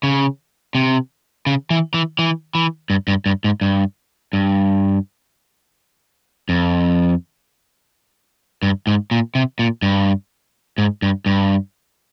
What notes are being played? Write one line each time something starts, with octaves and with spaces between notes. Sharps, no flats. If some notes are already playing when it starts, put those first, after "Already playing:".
C#3
C3
C#3
E3
E3
E3
E3
G2
G2
G2
G#2
G2
G2
F2
G2
G#2
A#2
C3
A#2
G2
G#2
G2
G2